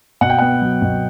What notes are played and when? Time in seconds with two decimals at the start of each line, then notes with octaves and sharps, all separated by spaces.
0.21 B2 F#5
0.30 G5
0.39 B3 F#5
0.62 F#3
0.82 B2